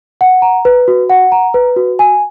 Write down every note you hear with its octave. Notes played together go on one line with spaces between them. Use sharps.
F#5
A#5
B4
F#4
F#5
A#5
B4
F#4
G#5